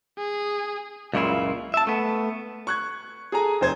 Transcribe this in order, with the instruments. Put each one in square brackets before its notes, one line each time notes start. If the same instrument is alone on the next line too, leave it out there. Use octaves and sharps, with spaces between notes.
[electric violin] G#4
[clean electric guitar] C#2 F#2 A#2 C#3 E4 F4
E5 A5
A3 B3
[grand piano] C#6 F#6 G#6
G#4 A4 G#5 A#5
F1 C5 G#6